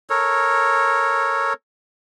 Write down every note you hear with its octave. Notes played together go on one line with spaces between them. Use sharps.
A4 A#4 C#5